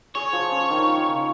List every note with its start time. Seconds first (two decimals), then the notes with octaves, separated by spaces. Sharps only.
0.15 G#4 C#5
0.33 F3
0.52 C#4
0.70 D#3
0.88 F4
1.06 C#3